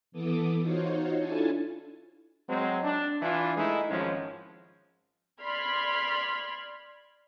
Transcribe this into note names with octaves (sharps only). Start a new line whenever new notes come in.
E3 B3 A4 D6 D#6
D#4 F4 F#4 C5 C#5
D4 E4 F4 A4 G#5 A5
F#3 G#3 C4
D4
E3 D4 E4 F4
G#3 A3 D#4 E4
G#1 F3 G#3 C#4
D5 B5 C6 F6 G#6